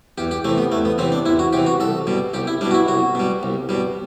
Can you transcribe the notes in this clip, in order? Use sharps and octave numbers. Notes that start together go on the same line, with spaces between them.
E2 G4
G4
C3 E3 A3
B3
E2 A3
B3
C3 E3 C4
D4
E2 E4
F#4
C3 E3 G4
F#4
C2 A4
B2 G3
C2 G4
E4
B2 G3 D4
F#4
E4
C2 F#4
B2 G3
C2
B2 G3